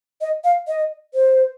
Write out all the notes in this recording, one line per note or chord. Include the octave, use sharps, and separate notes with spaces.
D#5
F5
D#5
C5